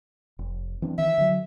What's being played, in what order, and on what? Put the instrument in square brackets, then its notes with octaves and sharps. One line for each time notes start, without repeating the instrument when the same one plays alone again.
[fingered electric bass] F1
E3 C4 D4
[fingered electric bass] D#3 E3 [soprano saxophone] E5
[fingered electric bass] D3 F#3